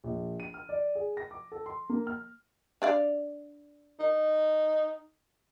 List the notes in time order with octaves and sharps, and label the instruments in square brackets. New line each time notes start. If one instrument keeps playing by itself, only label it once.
[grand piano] A#1
D#7
F6
D5
G#4
A#6
D6
A4
C6
A#3
F6
[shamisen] D4 D5 F5
[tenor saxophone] D#4